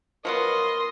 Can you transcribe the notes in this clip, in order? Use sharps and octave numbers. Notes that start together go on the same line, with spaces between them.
F3 F#3 B3 A#4 D#5 C6